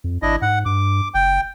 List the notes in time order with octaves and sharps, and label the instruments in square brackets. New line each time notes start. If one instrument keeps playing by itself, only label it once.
[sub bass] F2
[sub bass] G#1 [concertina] D4 E4 D#5
[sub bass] G#2 [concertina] F#5
[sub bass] G2 [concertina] D6
[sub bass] F#1 [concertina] G5